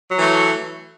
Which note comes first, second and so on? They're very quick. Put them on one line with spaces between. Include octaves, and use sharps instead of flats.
F#3 E3 A3